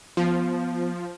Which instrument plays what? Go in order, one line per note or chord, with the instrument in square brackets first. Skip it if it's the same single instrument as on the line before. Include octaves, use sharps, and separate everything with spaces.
[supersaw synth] F3 [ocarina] B3